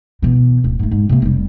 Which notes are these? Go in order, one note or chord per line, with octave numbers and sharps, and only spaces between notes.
B2 E3
D1
G#2 A3
G#2
C3 A#3
F1 G3